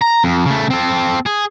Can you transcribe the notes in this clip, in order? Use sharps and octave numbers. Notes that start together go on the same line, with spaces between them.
A#5
F2
C#3 A3
C4 A4
G#4